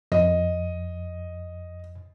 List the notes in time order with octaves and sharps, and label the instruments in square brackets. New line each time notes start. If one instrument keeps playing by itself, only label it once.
[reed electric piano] F2 [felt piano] D#5